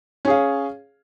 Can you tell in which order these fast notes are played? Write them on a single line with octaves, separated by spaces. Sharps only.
C#4 G#4 F5